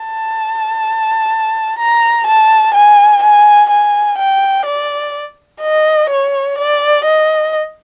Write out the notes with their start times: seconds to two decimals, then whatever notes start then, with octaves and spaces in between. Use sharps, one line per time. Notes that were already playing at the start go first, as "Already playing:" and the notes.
Already playing: A5
1.79 A#5
2.26 A5
2.74 G#5
3.23 G#5
3.70 G#5
4.19 G5
4.66 D5
5.61 D#5
6.10 C#5
6.58 D5
7.05 D#5